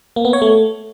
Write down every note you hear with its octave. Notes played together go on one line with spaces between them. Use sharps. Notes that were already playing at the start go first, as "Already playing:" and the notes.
A#3
B3
C#5
A3